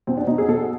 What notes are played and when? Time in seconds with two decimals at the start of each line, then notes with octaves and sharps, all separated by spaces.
0.07 B2 C4
0.17 D4
0.27 B2 D#4
0.38 G#4
0.49 B2 A4